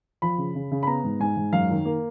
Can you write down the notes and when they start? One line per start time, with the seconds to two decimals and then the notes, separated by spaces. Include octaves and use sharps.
0.22 F3 B5
0.38 C#3
0.55 C#3
0.71 C#3
0.83 B5
0.87 B3 A#5
1.04 G#2
1.20 G#2 G#5
1.37 G#2
1.53 F#2 F5
1.70 D#3
1.86 A#3